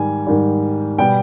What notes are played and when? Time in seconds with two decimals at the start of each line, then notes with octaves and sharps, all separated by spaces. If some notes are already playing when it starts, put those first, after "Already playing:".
Already playing: G#2 D#3 G3 G#5
0.27 G#2 D#3 G3
0.98 B2 G3 B3 G5